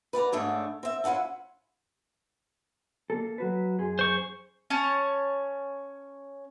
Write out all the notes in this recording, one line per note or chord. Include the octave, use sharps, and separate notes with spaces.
B4 D5 F#5 A#5
G#2 A3 D4 C#5
C4 E5
C#4 E4 F4 F#5 A5
A#3 A4
F#3 F#4 B4
F#2 G#4 C6
C5 C#6
C#4 C#5 A5